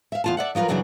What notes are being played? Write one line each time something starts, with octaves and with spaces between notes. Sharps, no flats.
E5 F5
E2 F4 A5
D5 E5 F#5
F3 F#3 F4 A#4 B4
F#2 C#3 E3 F#3 D4 F#4